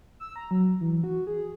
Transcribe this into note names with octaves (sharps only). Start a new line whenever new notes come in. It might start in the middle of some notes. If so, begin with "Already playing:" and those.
E6
A#5
F#3
E3
F#4
G#4